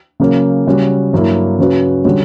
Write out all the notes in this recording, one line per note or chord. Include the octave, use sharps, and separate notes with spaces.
C#3 F#3 A#3 C#4
C#3 G3 C#4 F#4
G2 F#3 A#3 E4
C#3 F#3 C#4 F#4 B4
D3 G3 C#4 F#4